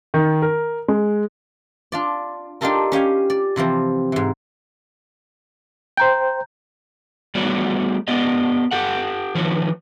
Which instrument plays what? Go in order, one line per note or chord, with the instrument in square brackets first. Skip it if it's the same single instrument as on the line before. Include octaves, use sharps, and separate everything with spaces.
[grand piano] D#3
A#4
G#3
[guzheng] D4 F4 D5
D4 D#4 F4 G4 A4 A#4
C#4 G4 F5 G#5
D5
C3 E3 F3 C4
G#2 E3
[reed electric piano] C5 G5 [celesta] A#5 G6
[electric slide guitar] G3 A3 B3 F#4 C#5 D5
B3 G4 D5 D#5
G4 A4 F#5
D#3 F3 B4 C#5